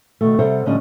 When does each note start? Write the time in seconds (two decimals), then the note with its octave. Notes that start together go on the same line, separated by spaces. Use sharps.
0.21 B2 D#3 A3
0.39 C3 G3 A4 C5 E5 F#5
0.65 A2 D3 F3 G3 C#4 D#5